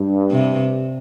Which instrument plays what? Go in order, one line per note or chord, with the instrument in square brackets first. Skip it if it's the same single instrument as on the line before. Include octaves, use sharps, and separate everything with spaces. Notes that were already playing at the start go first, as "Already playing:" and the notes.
Already playing: [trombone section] G2
[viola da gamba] C3